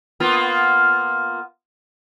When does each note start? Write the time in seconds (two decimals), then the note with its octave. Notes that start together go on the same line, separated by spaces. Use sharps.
0.20 A#3 B3 F4